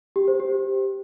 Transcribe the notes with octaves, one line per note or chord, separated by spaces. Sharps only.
G4
C5
G4